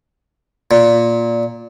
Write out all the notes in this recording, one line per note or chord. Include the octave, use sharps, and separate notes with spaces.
A#2